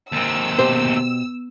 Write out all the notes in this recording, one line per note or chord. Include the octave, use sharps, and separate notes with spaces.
D#2 C3 E6
B2 G4 C5